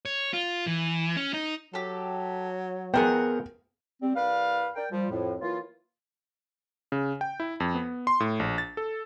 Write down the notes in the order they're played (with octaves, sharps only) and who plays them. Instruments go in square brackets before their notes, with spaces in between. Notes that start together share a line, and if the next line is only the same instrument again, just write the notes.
[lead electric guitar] C#5
F4
E3
C#4
D#4
[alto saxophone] F#3 [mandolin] G4 A4
[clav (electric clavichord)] B3 G#4 [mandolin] C4 A#4 F#5 [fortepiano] G5
[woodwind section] G3 C4
C2 B4 D5 F5
A#4 D5 G5
F3 G3
F2 A2
E3 F#3 A#3 E4 F4
[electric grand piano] C#3
G5
E4
F2
B3
C6
A2
A#1
A6
A4